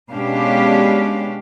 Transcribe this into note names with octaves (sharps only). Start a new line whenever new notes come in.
B2 G#3 C#4 D4 G4 F5